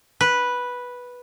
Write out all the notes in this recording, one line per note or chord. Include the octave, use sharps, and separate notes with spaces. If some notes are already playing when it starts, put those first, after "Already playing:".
B4